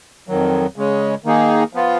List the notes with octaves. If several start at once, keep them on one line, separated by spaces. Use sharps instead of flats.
F2 D#3 F#3
C#3 G#3 C#4
D#3 A#3 D#4 G#4
F3 B3 F4